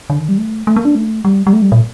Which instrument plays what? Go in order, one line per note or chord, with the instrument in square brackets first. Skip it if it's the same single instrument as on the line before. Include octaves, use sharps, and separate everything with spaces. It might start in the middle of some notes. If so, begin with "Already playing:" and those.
[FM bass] D3
D#3
G3
A3
A3
A#3
D4
A3
G3
G3
A3
G3
A#2